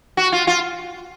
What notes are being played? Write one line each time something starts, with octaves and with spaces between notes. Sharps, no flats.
F#4
F4
F4